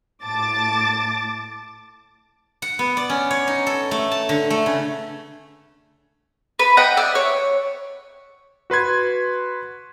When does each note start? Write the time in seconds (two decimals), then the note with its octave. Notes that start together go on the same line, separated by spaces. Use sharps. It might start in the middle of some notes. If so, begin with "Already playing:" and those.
0.23 A2 A5 D6 A6
2.62 F#5
2.79 B3
2.97 D5
3.10 C#4
3.31 C#5
3.48 D#4
3.67 A4
3.91 A3
4.11 A5
4.29 D3
4.50 A3
4.66 C#3
6.59 B4
6.77 D#5 F#5 G5 D#6
6.97 D5 E5
7.15 C#5
8.70 F#4 B4 C6 G#6